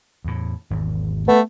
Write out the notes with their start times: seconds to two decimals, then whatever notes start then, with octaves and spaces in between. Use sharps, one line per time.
0.24 E2 A2
0.70 G#1 E2
1.28 A3 B3